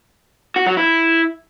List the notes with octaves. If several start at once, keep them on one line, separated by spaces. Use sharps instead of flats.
F#4
F#3
E4